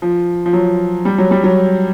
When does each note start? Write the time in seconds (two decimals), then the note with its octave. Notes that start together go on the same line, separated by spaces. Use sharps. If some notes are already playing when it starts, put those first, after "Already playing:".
0.02 F3
0.46 F3
0.53 F#3
1.05 G3
1.18 F#3
1.31 G3
1.44 F#3